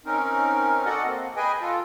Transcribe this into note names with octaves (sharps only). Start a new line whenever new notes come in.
C4 C#4 D#4 A#4
F#4 A4 D5 D#5 F#5
A#3 C4
G#4 B4 D#5 G5 G#5
F4 A4